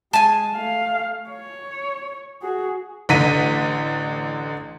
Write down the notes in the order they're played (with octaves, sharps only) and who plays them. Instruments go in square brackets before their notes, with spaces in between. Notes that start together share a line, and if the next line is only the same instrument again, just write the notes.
[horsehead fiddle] G#3 [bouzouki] G#5 A5
[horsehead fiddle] A3 F5
C#5
F#4 G#4
[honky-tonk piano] A1 D3 B6 D#7